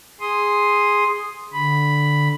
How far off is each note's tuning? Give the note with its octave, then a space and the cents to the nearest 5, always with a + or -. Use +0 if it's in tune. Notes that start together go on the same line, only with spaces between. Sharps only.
G#4 -10 C6 +0 D#6 +0
D3 +0 B5 +0